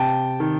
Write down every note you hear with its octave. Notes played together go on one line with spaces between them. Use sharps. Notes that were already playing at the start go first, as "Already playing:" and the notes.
Already playing: C3 G5 A5
D#3